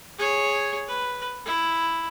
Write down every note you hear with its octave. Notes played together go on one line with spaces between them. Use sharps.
G#4 C#5
B4
E4